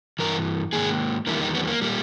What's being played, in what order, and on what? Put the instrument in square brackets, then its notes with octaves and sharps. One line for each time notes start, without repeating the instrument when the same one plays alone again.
[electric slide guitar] G2 E3 A#4
G#2 D#3 A#3 G#4
E2 D#3 G3 A#3 E4
D#4
B3
A#3
A#2 G3 A#3